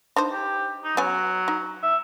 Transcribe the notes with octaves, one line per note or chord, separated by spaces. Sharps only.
D4 D#4 C5
G4
D#4
F#3 B3 C#4 G#5
D#4
E5